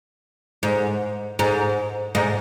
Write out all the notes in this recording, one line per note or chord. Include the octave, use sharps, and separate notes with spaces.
G#2
G#2
G#2